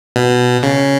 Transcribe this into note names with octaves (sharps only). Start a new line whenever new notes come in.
B2
C#3